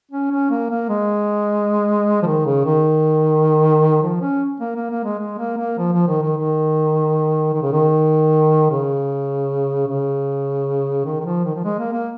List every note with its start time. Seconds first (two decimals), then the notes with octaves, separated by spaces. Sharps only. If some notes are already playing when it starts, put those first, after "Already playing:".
0.11 C#4
0.31 C#4
0.50 A#3
0.71 A#3
0.89 G#3
2.22 F3
2.26 D#3
2.46 C#3
2.66 D#3
4.02 F3
4.21 C#4
4.60 A#3
4.76 A#3
4.90 A#3
5.04 G#3
5.19 G#3
5.38 A#3
5.58 A#3
5.78 F3
5.92 F3
6.08 D#3
6.22 D#3
6.37 D#3
7.54 D#3
7.62 C#3
7.72 D#3
8.71 C#3
9.88 C#3
11.05 D#3
11.20 D#3
11.25 F3
11.45 D#3
11.55 F3
11.64 G#3
11.79 A#3
11.92 A#3